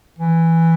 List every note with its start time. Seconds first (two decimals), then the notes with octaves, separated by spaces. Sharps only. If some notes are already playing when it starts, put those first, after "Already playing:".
0.19 E3